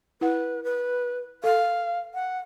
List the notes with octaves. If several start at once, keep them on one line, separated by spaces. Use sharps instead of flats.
E4 B4 F#5
B4
A4 F5
F#5